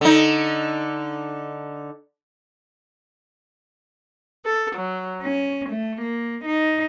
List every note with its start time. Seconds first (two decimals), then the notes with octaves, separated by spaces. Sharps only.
0.01 D3 D#4
4.45 A4
4.75 F#3
5.22 C#4
5.69 A3
6.02 A#3
6.44 D#4